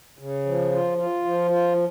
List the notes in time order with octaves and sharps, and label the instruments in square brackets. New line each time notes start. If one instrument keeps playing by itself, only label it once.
[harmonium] C#3
F3
F4
F4
F3
F4